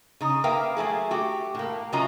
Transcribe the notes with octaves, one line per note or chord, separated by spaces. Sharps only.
C#3 D#4
A#3 A#4 B4 E5 F5 G5
F#3 A3 E4 G#4
A3 F#4 G4
A2 A#3
C3 F#3 C#4 F4 D#5 A#5